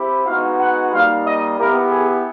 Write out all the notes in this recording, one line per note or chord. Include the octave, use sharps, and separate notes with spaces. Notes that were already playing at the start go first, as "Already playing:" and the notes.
Already playing: C4 E4 G4
G#3 B3 D#4 F#4 F5
F#5
G3 A#3 D#4 F5
D#5
B3 E4 G4 A#4
G#4